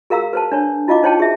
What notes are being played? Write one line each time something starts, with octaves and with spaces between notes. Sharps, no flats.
G#4 A#4 F5 A#5 E6
B4 C5 A5
D4 C#5
E4 F4 D#5 F5 D6
D#4 C5 C#5 G5 A5
G#4 E5